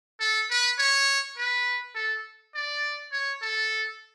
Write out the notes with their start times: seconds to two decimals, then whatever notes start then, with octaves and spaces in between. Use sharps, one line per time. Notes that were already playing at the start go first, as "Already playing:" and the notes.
0.20 A4
0.50 B4
0.79 C#5
1.37 B4
1.95 A4
2.55 D5
3.12 C#5
3.42 A4